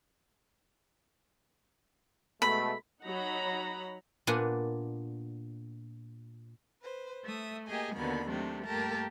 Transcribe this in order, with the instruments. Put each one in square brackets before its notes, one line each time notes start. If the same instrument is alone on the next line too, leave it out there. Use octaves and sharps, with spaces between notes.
[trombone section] B2 G#3 A3 [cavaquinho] B5
[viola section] F#3 D#4 F#5 A#5 B5
[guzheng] A#2 B3 D4 F#5 G#5
[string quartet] B4 C5
A3 E5 D#6
A#3 G4 G#4 D#5 G#5
D#2 B2 D3 A#3 B3 B5
C3 F#3 A3 C4 D4
G2 A3 A#3 G4 A#4 A5